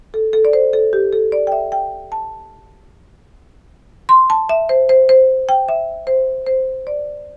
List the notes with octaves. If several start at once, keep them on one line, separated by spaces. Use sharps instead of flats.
A4
A4
D5
C5
A4
G4
A4
D5
G5
E5
G5
A5
C6
A5
E5
C5
C5
C5
G5
E5
C5
C5
D5